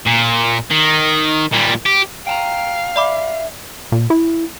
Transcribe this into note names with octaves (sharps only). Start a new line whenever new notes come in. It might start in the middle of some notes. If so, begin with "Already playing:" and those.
A#2
D#3
A#2 G3
G4
F5 G5 A5 A#5
D5 E5 B5 D6
A#2
E4